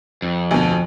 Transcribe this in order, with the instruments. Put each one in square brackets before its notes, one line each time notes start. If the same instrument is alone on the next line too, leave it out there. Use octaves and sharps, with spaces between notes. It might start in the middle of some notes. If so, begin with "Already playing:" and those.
[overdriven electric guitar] F2
[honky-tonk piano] D2 B2